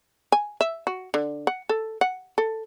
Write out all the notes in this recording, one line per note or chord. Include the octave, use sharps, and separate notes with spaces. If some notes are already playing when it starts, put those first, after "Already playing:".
G#5
E5
F#4
D3
F#5
A4
F#5
A4